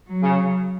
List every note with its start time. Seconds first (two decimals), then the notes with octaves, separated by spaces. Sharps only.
0.08 F#3
0.23 C#3